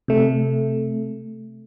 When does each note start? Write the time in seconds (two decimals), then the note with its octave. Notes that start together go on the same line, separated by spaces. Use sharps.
0.08 C3 A3